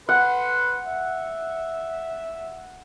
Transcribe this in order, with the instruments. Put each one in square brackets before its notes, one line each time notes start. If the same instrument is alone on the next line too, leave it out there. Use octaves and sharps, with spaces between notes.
[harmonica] B4 B5 C6 [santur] F#5
[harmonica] E5